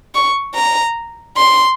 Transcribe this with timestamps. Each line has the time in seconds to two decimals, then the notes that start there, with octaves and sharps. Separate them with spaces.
0.15 C#6
0.55 A#5
1.37 C6